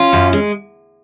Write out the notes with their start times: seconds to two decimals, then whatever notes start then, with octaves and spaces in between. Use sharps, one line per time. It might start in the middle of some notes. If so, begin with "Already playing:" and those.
Already playing: C#4 F4
0.13 F#2
0.33 G#3